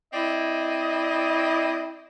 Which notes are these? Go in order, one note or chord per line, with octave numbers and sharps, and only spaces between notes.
C4 E4 D5 D#5